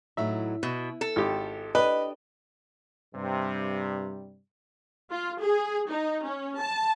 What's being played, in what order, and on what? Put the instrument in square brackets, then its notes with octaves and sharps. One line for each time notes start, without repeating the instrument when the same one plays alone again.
[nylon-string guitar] A2 F#3 D#4 [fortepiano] E5
[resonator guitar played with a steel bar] B2 [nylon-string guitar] E4
[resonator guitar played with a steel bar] A4
[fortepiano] G#1 G4
[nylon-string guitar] D4 G4 [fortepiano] B4 [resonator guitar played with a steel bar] D#5
[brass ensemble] G2 C3 G3
[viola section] F4
G#4
D#4
C#4
A5